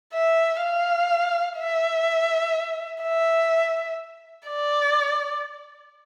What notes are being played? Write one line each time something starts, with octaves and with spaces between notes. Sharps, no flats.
E5
F5
E5
E5
D5